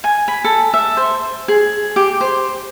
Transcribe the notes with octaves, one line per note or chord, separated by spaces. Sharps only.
G#5
B5
A4
E5
C5
G#4
G4
C5